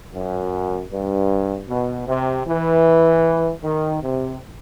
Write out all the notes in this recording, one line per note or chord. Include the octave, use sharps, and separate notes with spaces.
F#2
G2
B2
C3
E3
D#3
C3